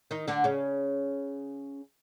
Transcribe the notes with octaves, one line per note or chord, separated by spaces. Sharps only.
D#3 D#4
D3 D4
C#3 C#4